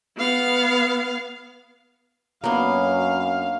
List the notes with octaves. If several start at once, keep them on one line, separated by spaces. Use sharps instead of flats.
B3 F5
F#2 F#3 A#3 B3 D4 E4 F5